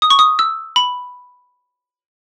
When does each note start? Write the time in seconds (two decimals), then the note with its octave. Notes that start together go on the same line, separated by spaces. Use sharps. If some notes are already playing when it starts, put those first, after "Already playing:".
0.02 D#6
0.10 C#6
0.19 D#6
0.39 E6
0.76 B5